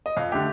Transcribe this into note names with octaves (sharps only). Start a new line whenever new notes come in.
D#5
F2 F5
D3 A3 G4